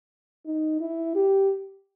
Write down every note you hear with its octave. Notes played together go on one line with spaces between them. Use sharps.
D#4
E4
G4